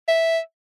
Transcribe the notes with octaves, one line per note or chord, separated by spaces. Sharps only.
E5